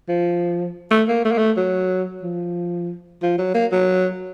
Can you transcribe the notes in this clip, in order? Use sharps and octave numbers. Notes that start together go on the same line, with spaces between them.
F3
A3
A#3
A3
A#3
A3
F#3
F3
F3
F#3
A#3
F#3